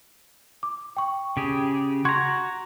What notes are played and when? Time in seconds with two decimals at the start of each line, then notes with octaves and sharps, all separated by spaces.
0.63 D6
0.97 G5 C#6
1.37 C#3 G4 G#4
2.05 F#4 A#5 C6 C#6 G#6